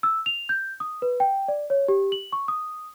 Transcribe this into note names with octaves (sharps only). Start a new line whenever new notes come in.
E6
F7
G6
D#6
B4
G5
D5
C#5
G4
F#7
C#6
D#6